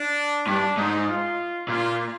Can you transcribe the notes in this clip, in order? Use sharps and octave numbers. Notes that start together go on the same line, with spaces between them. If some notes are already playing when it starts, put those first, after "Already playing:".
Already playing: D4
G2 D4
G#2 D#4
F4
A#2 F4